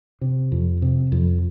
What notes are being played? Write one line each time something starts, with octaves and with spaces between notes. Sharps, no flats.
C3
F2
C3
F2